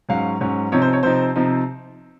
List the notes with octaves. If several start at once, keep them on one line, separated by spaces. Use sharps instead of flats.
G#2 F#3 C#4 F5
G#2 F#3 C#4
C3 F3 C4 D#4 C#5
C5
C#5
C3 F3 C4 D#4 C5
C3 F3 C4 D#4